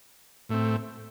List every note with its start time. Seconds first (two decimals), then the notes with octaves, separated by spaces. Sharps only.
0.49 A2 A3 C4